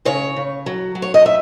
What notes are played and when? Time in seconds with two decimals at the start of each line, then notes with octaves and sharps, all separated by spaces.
0.05 C#3 C#5
0.36 C#3
0.66 F#3
0.95 F#3
1.02 C#5
1.14 D#5
1.25 A#2 E5